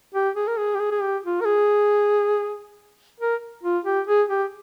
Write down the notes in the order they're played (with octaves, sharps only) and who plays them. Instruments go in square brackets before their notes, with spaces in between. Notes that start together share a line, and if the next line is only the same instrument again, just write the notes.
[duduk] G4
G#4
A#4
G#4
G4
G#4
G#4
G4
F4
A#4
G#4
A#4
F4
G4
G#4
G4